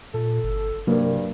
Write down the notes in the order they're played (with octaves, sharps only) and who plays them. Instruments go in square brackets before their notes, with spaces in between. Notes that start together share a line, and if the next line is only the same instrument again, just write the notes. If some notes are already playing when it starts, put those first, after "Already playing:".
[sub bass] A#2 [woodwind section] A4
[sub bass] G1
[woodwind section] C2 G2 [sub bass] C3 [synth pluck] F#3 A#3